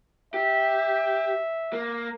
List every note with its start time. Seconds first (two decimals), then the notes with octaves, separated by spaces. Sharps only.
0.34 G4 E5
1.73 A#3